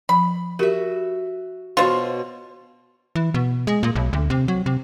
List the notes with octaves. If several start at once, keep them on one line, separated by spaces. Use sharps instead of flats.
F3 B5
F#4 G4 A#4 E5
B2 F4 C5 C#5
E3
B2
G#3
A#2
B1
D2
C3
F#3
C3